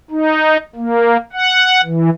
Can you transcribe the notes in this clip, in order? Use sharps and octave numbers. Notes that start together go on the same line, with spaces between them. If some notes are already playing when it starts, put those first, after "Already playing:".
D#4
A#3
F#5
E3